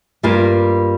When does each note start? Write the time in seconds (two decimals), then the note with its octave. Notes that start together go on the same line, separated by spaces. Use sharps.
0.23 G2 G3 A#3 F4 A#4